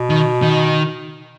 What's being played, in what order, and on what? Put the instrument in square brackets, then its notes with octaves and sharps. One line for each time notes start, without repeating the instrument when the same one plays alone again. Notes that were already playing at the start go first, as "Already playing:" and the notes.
Already playing: [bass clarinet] B2
[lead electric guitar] D#3
D#3